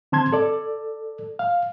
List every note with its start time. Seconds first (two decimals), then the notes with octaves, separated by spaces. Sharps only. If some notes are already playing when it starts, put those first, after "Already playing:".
0.12 D3 C4 A5 C6 G#6
0.33 A4 D5
1.39 F5